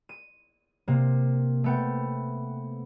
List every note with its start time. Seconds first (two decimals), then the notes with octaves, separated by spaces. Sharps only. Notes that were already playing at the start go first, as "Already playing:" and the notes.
0.09 D#7
0.88 C3 A#3
1.64 A3 B3 G5